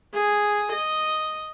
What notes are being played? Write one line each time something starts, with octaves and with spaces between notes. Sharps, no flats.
G#4
D#5